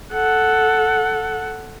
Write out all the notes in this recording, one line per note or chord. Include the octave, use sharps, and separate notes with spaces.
A4 F#5